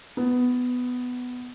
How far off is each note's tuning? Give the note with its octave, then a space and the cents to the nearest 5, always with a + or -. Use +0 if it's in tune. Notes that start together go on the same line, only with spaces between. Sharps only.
B3 +10